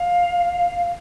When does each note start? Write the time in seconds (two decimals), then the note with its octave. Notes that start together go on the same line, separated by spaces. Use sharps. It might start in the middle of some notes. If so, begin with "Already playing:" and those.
Already playing: F5